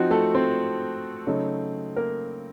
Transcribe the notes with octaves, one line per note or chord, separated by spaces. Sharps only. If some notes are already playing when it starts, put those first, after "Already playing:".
Already playing: F3 C4 D#4 F#4
A3 A4
C4 C5
C#3 F#3 A3 D#4
A#3 A#4